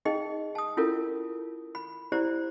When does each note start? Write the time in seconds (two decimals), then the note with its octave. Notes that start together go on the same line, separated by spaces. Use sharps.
0.05 D#4 G#4 D#5 G5
0.55 A5 D#6
0.77 C#4 E4 F4 A4 A#4
1.75 B5
2.12 E4 G4 C5 D5 A#5